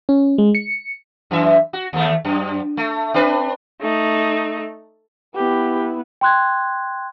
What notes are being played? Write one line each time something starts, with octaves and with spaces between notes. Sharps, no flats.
C#4
G#3
C#7
F#2 E3 E5
F#4
D#2 A3
F#2
A3
C4 D4 B4
A3 D#4
B3 E4 G4
G5 C6 F#6 G#6